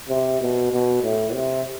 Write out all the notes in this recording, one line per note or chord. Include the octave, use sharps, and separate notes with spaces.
C3
B2
B2
A2
C3